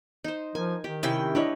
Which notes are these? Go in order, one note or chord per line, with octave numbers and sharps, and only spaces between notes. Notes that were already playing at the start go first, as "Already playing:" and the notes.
D#4 C5
F3 A#4 G#5
D#3 G4
C3 C#4 E4 G5
D4 E4 G4 B4 C#5 D#5